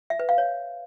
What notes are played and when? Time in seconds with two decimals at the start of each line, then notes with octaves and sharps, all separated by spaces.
0.10 E5
0.19 B4
0.29 F5
0.38 C#5